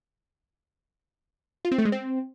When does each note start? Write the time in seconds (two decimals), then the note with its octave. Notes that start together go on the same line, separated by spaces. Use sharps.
1.65 F4
1.72 C4
1.78 A3
1.85 G#3
1.92 C4